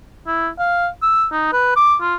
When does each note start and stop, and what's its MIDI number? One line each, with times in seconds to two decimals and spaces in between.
0.27 0.48 64
0.59 0.87 77
1.02 1.26 88
1.32 1.48 63
1.53 1.75 71
1.76 1.96 86
2.01 2.16 65